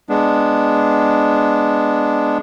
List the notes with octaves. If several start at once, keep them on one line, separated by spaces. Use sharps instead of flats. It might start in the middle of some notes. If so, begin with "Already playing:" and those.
G#3 B3 D4